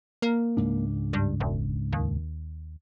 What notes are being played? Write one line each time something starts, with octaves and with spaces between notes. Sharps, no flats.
A#3
C#2 G#2 D4
G2
E1
D#2